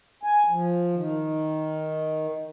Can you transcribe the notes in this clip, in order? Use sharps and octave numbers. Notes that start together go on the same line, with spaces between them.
G#5
F3
D#3